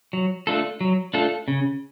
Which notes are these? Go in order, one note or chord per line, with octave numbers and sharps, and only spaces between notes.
F#3
A3 D4 F4 A4
F#3
A3 D4 F4 A4
C#3